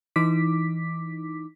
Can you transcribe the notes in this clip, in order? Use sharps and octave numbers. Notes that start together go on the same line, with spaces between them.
E3 D#4 D6 B6